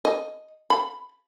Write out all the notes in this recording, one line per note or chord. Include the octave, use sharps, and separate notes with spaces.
D#5
B5